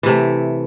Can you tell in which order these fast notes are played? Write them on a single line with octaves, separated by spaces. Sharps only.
E3 C3 A3